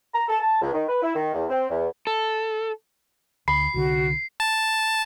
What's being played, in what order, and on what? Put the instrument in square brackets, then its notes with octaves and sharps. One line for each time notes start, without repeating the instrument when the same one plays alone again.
[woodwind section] A#5
A4
A5
C#2
D#3
B4
E4
D#3
E2
C4
E2
[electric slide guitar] A4
[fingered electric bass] D2 [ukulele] B5 [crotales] C7
[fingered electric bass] C2 D3 [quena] F#4
[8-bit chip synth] A5